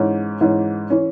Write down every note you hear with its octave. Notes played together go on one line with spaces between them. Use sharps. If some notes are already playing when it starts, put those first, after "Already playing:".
Already playing: G#2 E3 C#4
G#2 E3 C#4
E3 C#4